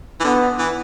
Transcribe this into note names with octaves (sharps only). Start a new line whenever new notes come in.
E3
D3 B3
E3